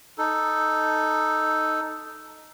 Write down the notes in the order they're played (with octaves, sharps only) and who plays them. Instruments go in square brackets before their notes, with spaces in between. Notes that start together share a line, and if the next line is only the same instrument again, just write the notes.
[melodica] D#4 A4